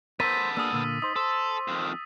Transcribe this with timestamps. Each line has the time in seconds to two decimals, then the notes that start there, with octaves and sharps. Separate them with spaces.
0.20 B3 A4 A#4 C5 A6 B6 D#7
0.57 A#3 D4 G#4 D#6 E6
0.73 A#2 D3 A#3
1.02 D#4 C5 D#6
1.16 A4 C5
1.68 F2 D#3